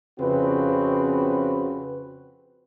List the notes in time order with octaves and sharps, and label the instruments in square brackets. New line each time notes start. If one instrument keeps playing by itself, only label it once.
[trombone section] F2 C#3 C4 F#4 B4